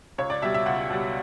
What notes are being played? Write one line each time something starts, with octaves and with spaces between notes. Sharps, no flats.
C#2 C#5
D5
B2 G3 E5
E5
C#2 F#5
B2 G3